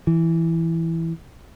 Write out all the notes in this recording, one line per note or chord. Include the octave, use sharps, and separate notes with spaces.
E3